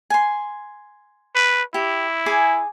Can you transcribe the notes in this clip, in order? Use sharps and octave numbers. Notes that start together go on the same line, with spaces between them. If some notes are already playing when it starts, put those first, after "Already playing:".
G#5 C6
B4
E4 G4
G#4 G#5 D6